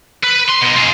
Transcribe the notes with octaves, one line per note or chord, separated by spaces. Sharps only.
B4
C6
B2 D#4
F4 G#4